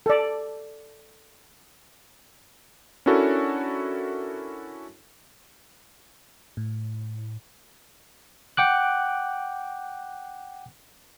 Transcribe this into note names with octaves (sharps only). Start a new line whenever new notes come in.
A4 D5
C#4 D4 E4 F#4 A4 A#4
A2
F#5 G5 D6 F#6